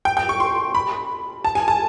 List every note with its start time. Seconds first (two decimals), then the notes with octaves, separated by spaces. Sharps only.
0.05 G5
0.17 G5
0.29 C#6
0.40 C6
0.75 B5
1.45 A5
1.55 G#5
1.68 A5